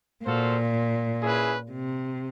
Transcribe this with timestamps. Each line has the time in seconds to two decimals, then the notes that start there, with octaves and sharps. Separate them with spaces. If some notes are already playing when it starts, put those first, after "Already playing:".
0.25 A#2 F#4 A4 C5 F5
1.22 C#4 E4 G#4 B4
1.71 C3